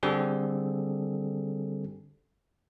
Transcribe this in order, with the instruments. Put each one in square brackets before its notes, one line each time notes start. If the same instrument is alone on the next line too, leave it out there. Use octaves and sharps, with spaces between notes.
[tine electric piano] D3 G3 C4 G#4 A4